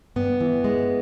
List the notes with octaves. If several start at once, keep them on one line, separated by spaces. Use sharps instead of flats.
G2 B3
E3
G#3